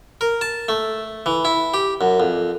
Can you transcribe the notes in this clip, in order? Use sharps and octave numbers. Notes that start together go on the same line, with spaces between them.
A#4
A5
A3
E3
E4
G4
F#2
F2